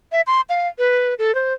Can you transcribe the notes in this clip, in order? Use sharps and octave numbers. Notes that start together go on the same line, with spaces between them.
E5
C6
F5
B4
A4
C5